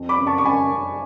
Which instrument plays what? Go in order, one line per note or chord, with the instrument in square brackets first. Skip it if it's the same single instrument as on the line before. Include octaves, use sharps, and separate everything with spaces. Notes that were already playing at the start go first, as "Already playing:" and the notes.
Already playing: [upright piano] F2
B5 D6
F#1
A5 C#6
C#6
F#1 G#5 B5
F#1